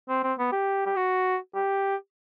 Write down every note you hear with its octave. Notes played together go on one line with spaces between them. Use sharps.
C4
C4
B3
G4
G4
F#4
G4